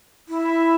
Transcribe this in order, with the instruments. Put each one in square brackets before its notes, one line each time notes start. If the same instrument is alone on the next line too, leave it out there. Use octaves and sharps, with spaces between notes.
[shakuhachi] E4